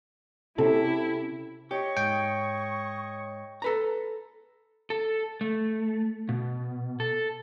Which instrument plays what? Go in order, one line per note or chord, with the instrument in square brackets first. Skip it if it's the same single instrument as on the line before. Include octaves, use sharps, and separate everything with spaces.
[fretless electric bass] C3 [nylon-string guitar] C#4 G4 A4 [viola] E4
[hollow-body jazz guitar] G4 [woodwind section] C#5 D#5 C#6
[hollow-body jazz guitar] G#2 [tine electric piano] G5
[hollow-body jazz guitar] A4 B4 A#5
[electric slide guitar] A4
A3
B2
A4